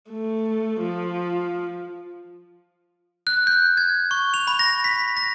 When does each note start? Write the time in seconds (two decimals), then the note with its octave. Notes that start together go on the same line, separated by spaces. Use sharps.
0.10 A3
0.81 F3
3.27 F#6
3.47 G6
3.77 G#6
4.11 C#6
4.34 F7
4.47 B5
4.59 A#6
4.84 B6
5.17 A#6